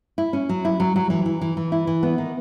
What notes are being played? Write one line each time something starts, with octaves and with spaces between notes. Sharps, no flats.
E4
C#4
F#3
E4
F#3
F#3
E3
E3
E3
E3
E4
E3
B3
D#3